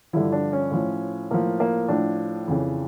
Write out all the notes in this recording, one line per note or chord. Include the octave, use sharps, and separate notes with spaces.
G2 D3 F3 E4
D4
C#4
A2 F3
A2 F3 A#3
A#3
A2 F3 D4
F2 C#3 E3